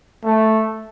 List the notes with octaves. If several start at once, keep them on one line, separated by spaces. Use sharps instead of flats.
A3